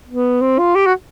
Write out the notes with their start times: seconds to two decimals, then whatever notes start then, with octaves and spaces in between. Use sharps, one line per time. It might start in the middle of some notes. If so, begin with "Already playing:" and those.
0.08 B3
0.41 C4
0.59 F4
0.75 G4
0.86 F#4